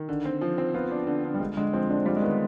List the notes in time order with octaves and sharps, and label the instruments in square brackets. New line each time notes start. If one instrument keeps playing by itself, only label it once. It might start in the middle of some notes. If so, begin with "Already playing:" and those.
Already playing: [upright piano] D#3
D3
C4
F3
C4
[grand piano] B3 [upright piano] F4
[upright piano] D4
D3
D3
[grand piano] G3
[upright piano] D3 [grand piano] G#3
[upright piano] D3 [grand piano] G#3
[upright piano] F3 [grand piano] C4
[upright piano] D3 [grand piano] D4
[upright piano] G3 [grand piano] F4
[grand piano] G#3
[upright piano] D#3 [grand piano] B3